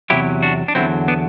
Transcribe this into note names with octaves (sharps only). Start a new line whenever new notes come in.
E2 C3 F#3 E4 G4
D4 F#4
D4
E2 D3 F#3 C4 E4
B3 D4